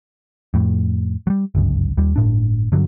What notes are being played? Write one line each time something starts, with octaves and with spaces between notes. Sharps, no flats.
F2 A2
F#3 G3
G1 C#2 F#2
D#2 G3
G1 A2 D4
G2 D3 F#3